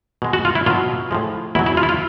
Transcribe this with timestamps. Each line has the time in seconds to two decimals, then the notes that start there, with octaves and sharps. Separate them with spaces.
0.22 B2 G#3
0.33 F#4
0.45 F4
0.55 E4
0.66 B2 F#3 F4
1.11 A2 F3 G#3
1.55 E2 B2 F#3 E4
1.66 E4
1.77 F4
1.83 E4
1.89 F4